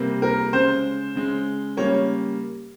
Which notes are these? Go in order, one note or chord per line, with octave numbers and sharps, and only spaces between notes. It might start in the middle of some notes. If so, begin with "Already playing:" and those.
Already playing: C3 G3 A#3
A#4
C#3 G#3 C5
C#3 G#3
C#3 G3 A#3 C#5